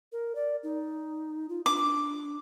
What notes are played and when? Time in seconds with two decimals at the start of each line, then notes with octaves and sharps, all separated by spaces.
0.12 A#4
0.35 D5
0.63 D#4
1.49 F4
1.66 D4 D6